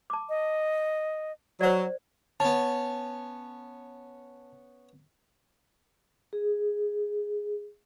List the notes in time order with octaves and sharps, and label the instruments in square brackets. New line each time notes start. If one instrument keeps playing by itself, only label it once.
[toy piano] A5 D6
[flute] D#5
[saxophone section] F#3 [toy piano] C5 D5
[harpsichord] B3 C#4 [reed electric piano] A5
[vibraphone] G#4